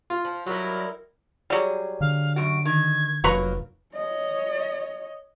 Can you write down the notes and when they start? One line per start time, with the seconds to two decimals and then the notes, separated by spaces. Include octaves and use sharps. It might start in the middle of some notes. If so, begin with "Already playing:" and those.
0.10 F4
0.25 F3
0.46 F#3 G3 D#4 E4 A#4
1.50 F#3 G3 G#4
2.01 D3 F5
2.36 F#2 F#4 D7
2.65 D#3 G#6
3.24 F1 F#3 A#3 B4 A#5 C#6
3.95 C#5 D#5